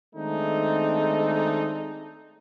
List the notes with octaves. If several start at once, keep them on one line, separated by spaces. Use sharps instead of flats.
D#3 G#3 A3 C4 D4 D#4